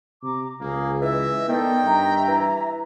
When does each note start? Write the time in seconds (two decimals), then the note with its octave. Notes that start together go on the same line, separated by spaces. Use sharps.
0.23 C3 A#5 D6
0.61 C#2 A#3 G#4
1.02 E3 D#5 E5
1.49 D#3 B3 A4 D5 G5
1.84 G2 E5 A#5
2.27 E3